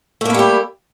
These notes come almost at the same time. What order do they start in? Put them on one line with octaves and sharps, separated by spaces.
A3 A#3 E4 G3 G4